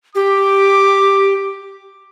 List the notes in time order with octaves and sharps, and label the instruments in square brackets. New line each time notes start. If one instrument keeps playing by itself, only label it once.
[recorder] G4 [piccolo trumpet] D6